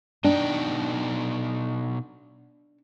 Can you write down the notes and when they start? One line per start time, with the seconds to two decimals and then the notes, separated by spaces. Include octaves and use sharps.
0.24 B2 D4 D#4 G5